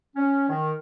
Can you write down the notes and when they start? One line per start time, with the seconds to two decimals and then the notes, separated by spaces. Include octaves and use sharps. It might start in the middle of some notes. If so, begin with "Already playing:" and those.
0.16 C#4
0.49 D#3